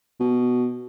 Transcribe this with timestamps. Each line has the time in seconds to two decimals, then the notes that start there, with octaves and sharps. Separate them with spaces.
0.20 B2